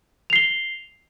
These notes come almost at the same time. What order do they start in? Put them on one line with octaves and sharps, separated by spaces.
F7 C7 G7